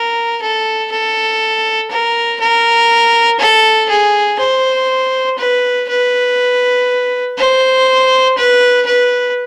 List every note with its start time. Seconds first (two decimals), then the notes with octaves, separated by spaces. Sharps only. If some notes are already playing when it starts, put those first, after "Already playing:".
Already playing: A#4
0.41 A4
0.91 A4
1.91 A#4
2.40 A#4
3.39 A4
3.89 G#4
4.39 C5
5.38 B4
5.89 B4
7.38 C5
8.37 B4
8.86 B4